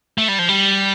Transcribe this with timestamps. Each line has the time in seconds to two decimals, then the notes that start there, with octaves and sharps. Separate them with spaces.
0.18 A3
0.28 G3
0.39 F3
0.49 G3